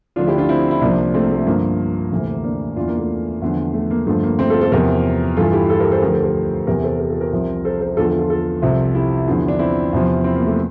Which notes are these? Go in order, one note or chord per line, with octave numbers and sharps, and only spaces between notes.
D2 D3 F3 D4 F4
E4 G4
D4 F4
C4 E4
E4
C2 C3 F3 A#3 D4
A3 C4
A3
G2 D3 F3 A#3
D2 C3 E3
A#3 D4
E2 E3 D4 F4
A#3
A3
E2 D3 F3
A3
A#3
G2 D3 F3 A3
A#3
A3 C4
F4 A4
A4 C5
E2 C3 F3 G4 A#4
G2 E3 F4 A4
E4 G4
F4 A4
G4 A#4
A4 C5
D2 D3 F3 G4 A#4
A4 C5
G4 A#4
E2 C3 E3 G4 A#4
A4 C5
G4 A#4
F4 A4
G4 A#4
C2 C3 F3
A4 C5
A4 C5
E2 D3 F3 F4 A4
F4 A4
F4 A4
F4 A4
C2 C3 F3
E4 G4
E2 D3 F3
D4
C4 E4
E2 C3 F3
C4 E4
A#3
A3